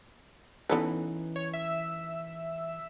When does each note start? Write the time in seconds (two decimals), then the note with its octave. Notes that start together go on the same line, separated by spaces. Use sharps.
0.70 E3 B3 C#4 D#4 A4 B4
1.36 C#5
1.54 E5 E6